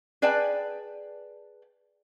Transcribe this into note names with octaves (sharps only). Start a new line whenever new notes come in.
G#4 B4 D5 G5 A5